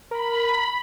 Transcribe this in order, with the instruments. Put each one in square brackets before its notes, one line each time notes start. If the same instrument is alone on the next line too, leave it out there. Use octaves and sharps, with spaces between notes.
[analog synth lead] A#4 [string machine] B5